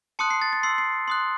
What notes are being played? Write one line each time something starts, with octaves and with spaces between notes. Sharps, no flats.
A5 C6 D#6 F#6 C#7
C7
A6
A6
C6 E6 C7
C7
C6 D#6 F#6